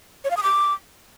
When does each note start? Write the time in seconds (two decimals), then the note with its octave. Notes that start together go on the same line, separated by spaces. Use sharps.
0.24 C#5
0.31 F5
0.37 D#6
0.43 D6